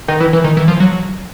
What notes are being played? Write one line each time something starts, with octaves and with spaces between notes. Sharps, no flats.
D#3
E3
E3
D#3
E3
F3
F#3